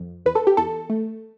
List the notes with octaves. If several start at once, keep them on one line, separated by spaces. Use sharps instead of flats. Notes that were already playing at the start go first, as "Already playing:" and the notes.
Already playing: F2
E2 B4
A4
G4
E2 A4
A3